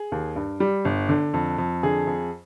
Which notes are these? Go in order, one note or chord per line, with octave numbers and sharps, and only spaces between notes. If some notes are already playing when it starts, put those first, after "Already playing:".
Already playing: G#4
D#2
G2
G3
G1
D3
F2
F2
D3 G#4
F2